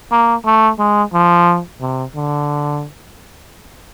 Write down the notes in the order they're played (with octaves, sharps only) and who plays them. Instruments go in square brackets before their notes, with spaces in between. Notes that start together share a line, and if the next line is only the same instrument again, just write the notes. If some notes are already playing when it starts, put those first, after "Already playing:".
[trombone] A#3
A3
G#3
F3
C3
D3